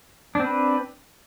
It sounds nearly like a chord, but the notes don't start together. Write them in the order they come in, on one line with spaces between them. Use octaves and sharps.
D4 C4 B4